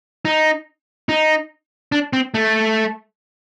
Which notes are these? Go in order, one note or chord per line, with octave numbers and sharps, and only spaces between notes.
D#4
D#4
D4
C4
A3